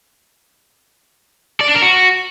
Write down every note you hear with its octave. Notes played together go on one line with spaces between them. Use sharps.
D5
D4
A#4
F#4